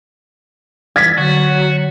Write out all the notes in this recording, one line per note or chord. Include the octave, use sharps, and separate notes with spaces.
E3 G#6 A6 B6
D3 F#3 F#4